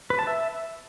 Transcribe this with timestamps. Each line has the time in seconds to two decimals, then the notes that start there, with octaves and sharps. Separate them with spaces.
0.10 B4
0.19 A5
0.27 E5